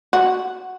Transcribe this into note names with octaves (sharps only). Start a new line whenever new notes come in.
F#4